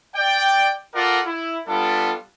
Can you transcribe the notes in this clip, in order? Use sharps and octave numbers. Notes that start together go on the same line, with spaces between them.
D5 G5
F4 A4 A#4 D5 F#5
E4
G3 B3 D4 F4 A4